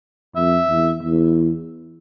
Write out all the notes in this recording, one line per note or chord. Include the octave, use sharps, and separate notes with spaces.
F2 E5
E2
E2